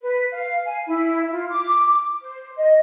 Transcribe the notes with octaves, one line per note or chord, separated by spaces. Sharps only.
B4
F5
G#5
E4
F4
D6
C5
D#5